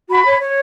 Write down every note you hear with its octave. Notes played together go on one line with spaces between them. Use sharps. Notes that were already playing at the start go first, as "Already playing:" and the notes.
F#4 B5
C#5
C#5